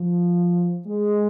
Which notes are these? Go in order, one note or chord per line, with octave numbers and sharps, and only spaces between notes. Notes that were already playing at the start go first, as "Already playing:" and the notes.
Already playing: F3
G#3